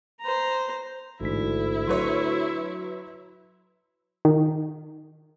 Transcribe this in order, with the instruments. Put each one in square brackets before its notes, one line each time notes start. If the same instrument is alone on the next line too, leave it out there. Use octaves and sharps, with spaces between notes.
[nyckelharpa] C5 A#5
[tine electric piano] A1 G#2 B6 [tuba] D2 [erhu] E4
[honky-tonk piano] F#3 B4 C#5 [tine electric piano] C6
[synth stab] D#3